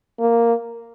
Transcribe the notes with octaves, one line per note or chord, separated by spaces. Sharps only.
A#3